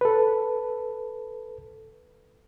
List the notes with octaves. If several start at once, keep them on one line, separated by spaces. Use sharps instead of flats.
A4 B4